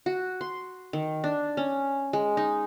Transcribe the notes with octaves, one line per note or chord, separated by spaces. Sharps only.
F#4
C6
D#3
D4
C#4
G#3
D#4